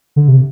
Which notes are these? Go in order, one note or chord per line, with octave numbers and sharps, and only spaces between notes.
D3
C3